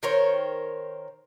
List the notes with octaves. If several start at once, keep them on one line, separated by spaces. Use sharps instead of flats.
D#3 A#4 C5 C#5